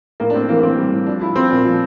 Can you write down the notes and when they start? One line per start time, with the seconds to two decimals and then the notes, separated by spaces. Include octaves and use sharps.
0.20 A2 A#3
0.30 D4
0.34 A2 C4
0.49 E3 A#3
0.59 A#3
0.63 E3 C4
0.78 G3
0.93 A2
1.06 F3 D4
1.21 F3 E4
1.36 F3 C4
1.51 A#2
1.65 F3